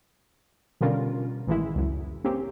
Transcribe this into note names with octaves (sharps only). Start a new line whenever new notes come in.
B2 D3 G3 C#4 F4 A#4
A1 D#3 E3 G#3 E4
C#2 F#2
A#3 C4 C#4 G4